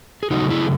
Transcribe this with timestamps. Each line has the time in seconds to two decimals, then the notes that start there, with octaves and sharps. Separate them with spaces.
0.23 G#4
0.31 C#3 F#3 A3 D#4 F#4
0.50 E4 G#4